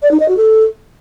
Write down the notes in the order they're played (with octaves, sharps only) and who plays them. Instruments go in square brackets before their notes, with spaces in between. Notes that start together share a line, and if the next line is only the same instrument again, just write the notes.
[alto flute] D5
D#4
D#5
F#4
A4